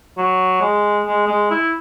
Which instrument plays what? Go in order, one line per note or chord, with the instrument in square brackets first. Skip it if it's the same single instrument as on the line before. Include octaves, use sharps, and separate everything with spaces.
[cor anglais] F#3
G#3
G#3
G#3
E4